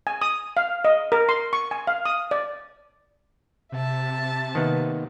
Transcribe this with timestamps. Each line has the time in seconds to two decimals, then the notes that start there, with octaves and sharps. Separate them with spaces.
0.07 G#5
0.22 D#6
0.57 F5
0.85 D#5
1.12 A#4
1.29 C6
1.53 C#6
1.71 G#5
1.87 F5
2.06 D#6
2.31 D5
3.72 C3 E5 A5
4.55 D#3 A#3 B3